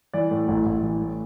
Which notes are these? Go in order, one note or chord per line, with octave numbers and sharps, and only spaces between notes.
E3 D5
A2
A1
A1
E3
A2